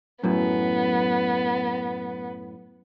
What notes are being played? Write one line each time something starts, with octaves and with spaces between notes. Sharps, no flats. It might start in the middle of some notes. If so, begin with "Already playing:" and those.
F#2 A2 B3